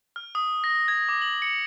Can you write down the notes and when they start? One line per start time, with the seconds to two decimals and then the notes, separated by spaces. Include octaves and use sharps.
0.16 F6
0.35 D#6
0.64 A#6
0.88 G#6
1.09 D6
1.21 F#7
1.42 C#7